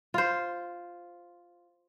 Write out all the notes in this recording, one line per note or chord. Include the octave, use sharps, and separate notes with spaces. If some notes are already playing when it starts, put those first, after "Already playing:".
F4 C5